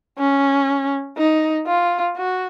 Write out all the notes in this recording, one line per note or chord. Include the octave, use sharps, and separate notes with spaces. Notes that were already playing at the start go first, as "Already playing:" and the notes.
C#4
D#4
F4
F#4